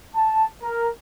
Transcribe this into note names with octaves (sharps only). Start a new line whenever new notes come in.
A5
A#4